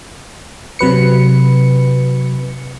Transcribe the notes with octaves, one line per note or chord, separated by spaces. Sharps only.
C3 F#3 B4 C#7